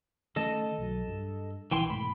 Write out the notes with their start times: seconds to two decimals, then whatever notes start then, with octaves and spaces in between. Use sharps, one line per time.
0.36 D#3 A3 C#4 A4 D#5 A5
0.78 B1 F#3
1.08 G2
1.71 A#1 E3 G5 C6
1.90 G#2 B2 A3 B5